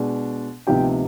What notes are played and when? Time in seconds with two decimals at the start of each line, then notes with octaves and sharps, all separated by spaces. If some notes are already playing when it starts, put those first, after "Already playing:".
Already playing: B2 G#3 D4
0.67 D2 C3 F3 B3 D#4 G4 G5